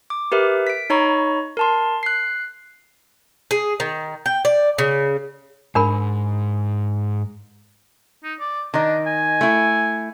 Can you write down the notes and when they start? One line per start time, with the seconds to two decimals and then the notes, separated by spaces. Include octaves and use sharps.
0.10 D6
0.32 G4 A#4 B4 E5
0.67 B6 D7
0.90 D#4 C#5 A#5 B5 C#6
1.57 A#4 A5 C6
2.03 F#6 C7
3.51 G#4
3.80 D#3
4.26 G5
4.45 D5
4.78 C#3
5.75 G#2 D4 A#4 B5
8.24 D#4
8.40 D5
8.74 D#3 D4 D#5
9.07 G#5
9.41 A3 E4